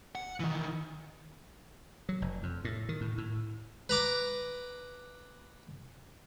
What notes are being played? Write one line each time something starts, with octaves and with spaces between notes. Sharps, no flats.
F#5
D#3 E3
F#3
F1
F2
A2
D#3
A2
A2
B4 A#5 D6